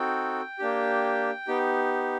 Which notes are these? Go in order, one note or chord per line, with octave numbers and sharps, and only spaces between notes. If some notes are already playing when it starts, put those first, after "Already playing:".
Already playing: C4 D#4 F#4 A4 G5
A#3 D4 G4
B3 D#4 G4